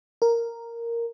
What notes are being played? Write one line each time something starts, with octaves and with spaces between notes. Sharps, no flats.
A#4